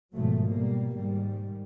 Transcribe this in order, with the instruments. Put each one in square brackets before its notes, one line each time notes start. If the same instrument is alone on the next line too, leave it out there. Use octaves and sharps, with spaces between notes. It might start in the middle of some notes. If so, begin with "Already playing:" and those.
[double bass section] G#2 B2 D#3 F3 F#3 A3
B2 G3 A#3
G#2 D#3 G3